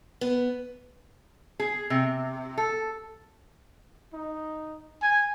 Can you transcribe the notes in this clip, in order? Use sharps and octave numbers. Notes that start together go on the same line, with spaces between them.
B3
G#4
C3
A4
D#4
G#5